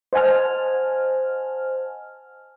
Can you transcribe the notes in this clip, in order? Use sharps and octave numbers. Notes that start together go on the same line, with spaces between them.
C5 D#5 F#5 G#5 A5 F6